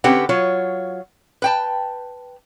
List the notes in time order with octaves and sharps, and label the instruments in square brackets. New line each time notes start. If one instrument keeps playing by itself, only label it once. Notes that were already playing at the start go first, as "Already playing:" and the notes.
[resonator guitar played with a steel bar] D3 C4 C#4 G4 B4 F#5
F#3 F4 C#5
B4 G5 A5